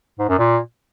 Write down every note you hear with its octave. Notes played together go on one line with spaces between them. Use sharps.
G#2
F#2
A#2